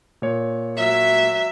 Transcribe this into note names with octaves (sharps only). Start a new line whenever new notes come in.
A#2 C#5
F#3 E5